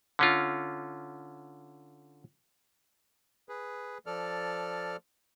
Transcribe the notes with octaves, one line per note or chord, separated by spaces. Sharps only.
D3 C#4 F4
G#4 B4
F3 A4 D5 F6